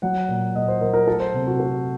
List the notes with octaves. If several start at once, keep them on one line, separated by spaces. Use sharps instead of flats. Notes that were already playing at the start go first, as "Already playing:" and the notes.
F#3 F#5
A#2
A#2 D#5
C5
F#3 A#4
A#4
A3 A4
C5
C3
F#4
A3 A4